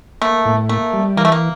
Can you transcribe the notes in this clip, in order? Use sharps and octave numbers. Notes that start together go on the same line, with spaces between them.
A3 A#3
A2
A3 A#3
G3
E3 A#3
A3
A#3